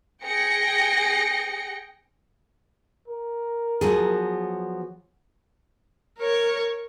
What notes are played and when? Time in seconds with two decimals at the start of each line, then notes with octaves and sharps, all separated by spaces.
0.24 G#4 G5 A#6 C#7
3.08 A#4
3.81 F3 F#3 B3 G#4
6.18 A#4 C#5